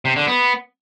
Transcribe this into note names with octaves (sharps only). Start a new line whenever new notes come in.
C3
D3
B3